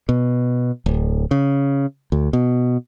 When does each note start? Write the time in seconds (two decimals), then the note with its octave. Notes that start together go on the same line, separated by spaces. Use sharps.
0.09 B2
0.86 D1
1.31 C#3
2.12 D2
2.33 B2